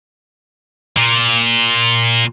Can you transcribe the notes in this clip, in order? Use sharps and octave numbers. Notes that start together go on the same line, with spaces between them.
A#2